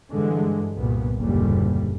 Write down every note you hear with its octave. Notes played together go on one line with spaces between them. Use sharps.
G2 D3 E3 G#3
C2 G2 A#2 B3
F#1 D#2 A#2 D3 G3